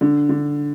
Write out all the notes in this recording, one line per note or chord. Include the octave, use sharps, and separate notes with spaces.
D3
D3